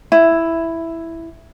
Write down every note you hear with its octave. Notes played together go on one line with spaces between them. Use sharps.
E4